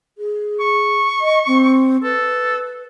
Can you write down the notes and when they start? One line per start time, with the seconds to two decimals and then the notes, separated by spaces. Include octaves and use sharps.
0.18 G#4
0.60 C#6
1.21 D#5
1.47 C4
2.03 A4 B4